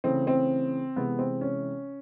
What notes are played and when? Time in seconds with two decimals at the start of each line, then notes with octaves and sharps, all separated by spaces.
0.04 C#3 E3 A3 C4
0.27 C4
0.96 C3 E3 G#3 B3
1.19 C4
1.41 C#4